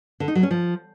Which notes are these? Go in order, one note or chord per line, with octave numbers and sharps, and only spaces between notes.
D3
D#4
F#3
C#4
F3